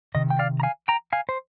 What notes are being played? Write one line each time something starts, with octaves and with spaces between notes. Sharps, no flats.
C3 D#3 D#5
G5
D5 F5
A#5
F5 G#5
G5 A#5
F5 G#5
C5